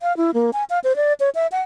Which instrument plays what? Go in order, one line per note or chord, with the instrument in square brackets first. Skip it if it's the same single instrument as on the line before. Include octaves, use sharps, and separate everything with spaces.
[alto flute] F5
E4
A#3
G#5
F5
C5
D5
C#5
E5
F#5